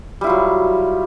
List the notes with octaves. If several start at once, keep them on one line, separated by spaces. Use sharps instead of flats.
F#3 G3 E4 F4